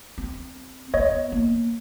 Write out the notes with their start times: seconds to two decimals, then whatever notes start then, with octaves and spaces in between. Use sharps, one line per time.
0.18 C4
0.94 B3 C#5 D#5
1.32 A#3